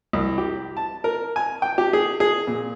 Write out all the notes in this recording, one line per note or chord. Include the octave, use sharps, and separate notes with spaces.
C2
G4
A5
A#4
G#5
G5
G4
G#4
G#4
A#2